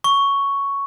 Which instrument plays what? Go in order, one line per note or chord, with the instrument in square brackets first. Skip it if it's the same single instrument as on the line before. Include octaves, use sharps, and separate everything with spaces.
[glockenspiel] C#6